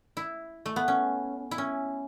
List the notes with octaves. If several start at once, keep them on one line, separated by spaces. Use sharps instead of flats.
E4
A3
B3
C#4
E4
C#4